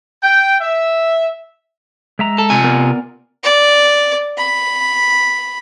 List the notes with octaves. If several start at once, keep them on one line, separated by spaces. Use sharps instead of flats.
G5
E5
G#3 E5 A#5
A4
C3 F4 G#5
B3 A#4 D5
D5
B5